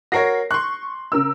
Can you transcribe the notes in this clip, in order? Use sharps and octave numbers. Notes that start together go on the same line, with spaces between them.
F#4 A#4 C#5 A#6 C7
C6 C#6 F#6
C#3 A#4 E6